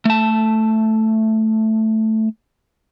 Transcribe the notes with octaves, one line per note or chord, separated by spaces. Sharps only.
A3 A5